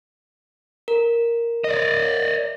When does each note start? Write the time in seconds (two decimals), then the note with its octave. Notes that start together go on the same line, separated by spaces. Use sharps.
0.88 A#4
1.64 D5 D#5